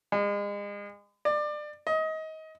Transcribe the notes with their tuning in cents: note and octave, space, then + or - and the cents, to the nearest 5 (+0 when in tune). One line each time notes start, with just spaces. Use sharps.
G#3 -35
D5 +25
D#5 +25